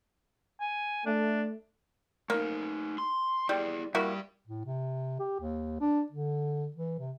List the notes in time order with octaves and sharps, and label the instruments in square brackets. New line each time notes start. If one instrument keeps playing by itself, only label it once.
[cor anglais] G#5
[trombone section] A3 [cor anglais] D4
[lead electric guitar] A3 D#4 [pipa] A#3
[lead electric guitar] C6
[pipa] G3 [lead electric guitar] E4 G#4
[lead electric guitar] G2 G4 [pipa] A#3 E4 F#4
[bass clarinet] A2
C3
G4
D#2
D4
D3
E3
C3